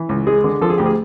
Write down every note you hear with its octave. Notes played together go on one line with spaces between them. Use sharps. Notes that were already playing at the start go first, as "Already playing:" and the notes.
Already playing: E3
C#2
G#3 G#4
D3
F3 A4
G#4
D2 G4
G#4